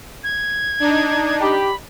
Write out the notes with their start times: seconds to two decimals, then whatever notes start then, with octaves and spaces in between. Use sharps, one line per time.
0.24 G#6
0.80 D4 D#4
1.40 G4 B5